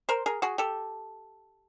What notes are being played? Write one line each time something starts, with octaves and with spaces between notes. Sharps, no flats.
A#4 C5
G#4 A#4
F#4 G#4
G4 A4